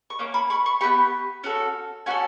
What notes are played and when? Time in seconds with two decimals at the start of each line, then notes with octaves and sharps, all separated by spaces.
0.10 C#6
0.19 A#3 C#4 D6
0.34 B5 C#6
0.50 B5 C#6
0.66 B5 C#6
0.81 B3 E4 G4 B5 C#6
1.44 C#4 F#4 A4
2.06 C#4 F#4 A4 F#5 G#5